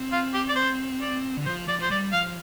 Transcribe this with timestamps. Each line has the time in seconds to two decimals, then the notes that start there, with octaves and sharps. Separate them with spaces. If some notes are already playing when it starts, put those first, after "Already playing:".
Already playing: C4
0.12 F4
0.34 G4
0.49 D5
0.56 C5
1.01 D5
1.37 D3
1.46 F3 C5
1.68 F3 D5
1.79 F3 C5
1.90 G3 D5
2.13 F3 F5